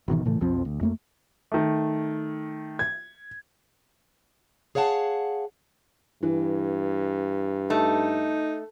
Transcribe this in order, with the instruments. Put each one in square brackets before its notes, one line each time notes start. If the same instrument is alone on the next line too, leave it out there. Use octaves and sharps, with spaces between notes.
[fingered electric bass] G#1 B2 D#3 E3
A2 C#3 E3 A3
B1 F2 F3 C4
D2
F2 A3 A#3
[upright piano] D#3 A3
G#6
[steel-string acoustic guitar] G#4 C#5 F5 F#5 A5
[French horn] G2 [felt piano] E3
[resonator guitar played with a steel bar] A3 [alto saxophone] D#4